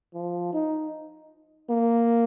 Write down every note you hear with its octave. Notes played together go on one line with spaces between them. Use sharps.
F3
D#4
A#3